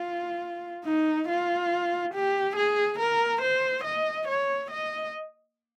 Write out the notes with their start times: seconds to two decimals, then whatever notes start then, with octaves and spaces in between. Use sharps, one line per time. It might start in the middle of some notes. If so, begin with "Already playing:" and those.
Already playing: F4
0.84 D#4
1.28 F4
2.14 G4
2.56 G#4
2.99 A#4
3.41 C5
3.84 D#5
4.28 C#5
4.70 D#5